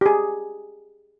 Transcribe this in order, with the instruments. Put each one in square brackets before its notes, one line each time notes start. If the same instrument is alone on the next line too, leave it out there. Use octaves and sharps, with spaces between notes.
[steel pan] G4 G#4